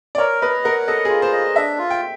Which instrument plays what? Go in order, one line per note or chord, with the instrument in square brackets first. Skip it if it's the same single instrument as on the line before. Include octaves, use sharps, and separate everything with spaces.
[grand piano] D5
[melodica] A#4 [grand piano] C#5
[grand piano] B4 [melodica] D#5
[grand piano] A#4 [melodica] F#5
[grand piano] A4 [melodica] D#5
[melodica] F4 [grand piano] G#4
[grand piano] C5
[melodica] D#5
[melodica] D4 [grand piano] E5
[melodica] F4
[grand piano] G5